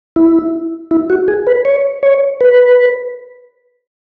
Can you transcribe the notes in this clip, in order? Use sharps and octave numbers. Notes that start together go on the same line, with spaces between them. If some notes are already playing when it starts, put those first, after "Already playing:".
E4
E4
F#4
G#4
B4
C#5
C#5
B4